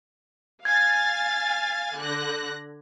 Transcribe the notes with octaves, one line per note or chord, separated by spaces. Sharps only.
F5 G#5 G#6 A6
D3 F#6 A#6